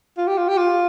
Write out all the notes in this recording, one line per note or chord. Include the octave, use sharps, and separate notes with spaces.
F4
G4
F4
G4
F4